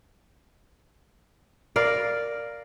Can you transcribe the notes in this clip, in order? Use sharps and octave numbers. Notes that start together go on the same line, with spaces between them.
A#4 D5 F5